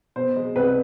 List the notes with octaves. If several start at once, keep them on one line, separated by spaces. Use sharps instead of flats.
B2 C5
G#3
C2 B4